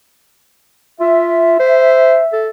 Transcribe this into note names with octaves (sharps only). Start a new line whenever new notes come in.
F4 E5
C5
A4